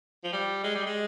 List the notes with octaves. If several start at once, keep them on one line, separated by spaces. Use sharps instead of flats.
F3
G3
G#3
G3
G#3